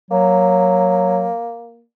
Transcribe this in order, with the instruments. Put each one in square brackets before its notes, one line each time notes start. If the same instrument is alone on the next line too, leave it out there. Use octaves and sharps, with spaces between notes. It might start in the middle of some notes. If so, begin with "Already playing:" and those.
[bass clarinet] F#3 [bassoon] A#3